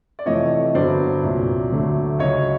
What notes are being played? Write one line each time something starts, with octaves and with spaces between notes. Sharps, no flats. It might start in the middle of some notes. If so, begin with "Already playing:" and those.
D5
F2 C3 E3 A3 C#5 D#5
G2 D3 F#3 B3 C5 D5
C2 A#2 F#3
D2 D3 F#3 A3
C#2 C#3 F#3 C#5 D#5